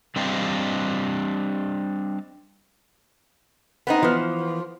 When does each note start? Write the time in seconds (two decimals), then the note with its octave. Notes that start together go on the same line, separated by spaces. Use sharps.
0.16 G3 C4 D4 G4 D#5 F5
3.87 B3 C4 D#4
4.03 E3 F3 B3